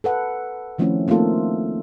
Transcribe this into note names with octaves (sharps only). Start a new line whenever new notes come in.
A4 B4 F#5
D#3 F3 A3 C4 C#4 E4
A3 A#3 C4 D#4 F4 A4